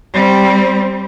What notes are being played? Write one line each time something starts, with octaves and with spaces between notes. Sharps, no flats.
G3 C4